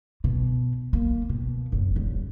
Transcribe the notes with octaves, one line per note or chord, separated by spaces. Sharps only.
B2
A#3
B2
F#1
D#1